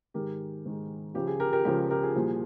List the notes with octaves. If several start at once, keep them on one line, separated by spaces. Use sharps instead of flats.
G#2 D#3 G#3 G4 A#4
G#2 D#3 G#3
C#2 C#3 F3 G#3 G4
G#4
G4 A#4
G4 A#4
C#2 C#3 F3 G#3 G4
G4 A#4
G#4
C2 A#2 F3